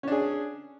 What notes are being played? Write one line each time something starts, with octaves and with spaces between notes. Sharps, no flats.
C#4 D4 G#4